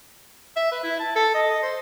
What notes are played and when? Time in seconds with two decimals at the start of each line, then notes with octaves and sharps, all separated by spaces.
0.56 E5
0.72 B4
0.83 E4
1.00 A5
1.16 A4
1.34 D#5
1.50 D#5
1.62 C5